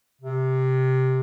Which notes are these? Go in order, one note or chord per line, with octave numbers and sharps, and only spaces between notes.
C3